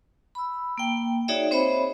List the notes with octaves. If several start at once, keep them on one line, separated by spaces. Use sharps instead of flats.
B5 E6
A#3 G5
D#4 F#4 G#4 C#5 D5 E5
C4 C5 C#5 D#5 E5 B5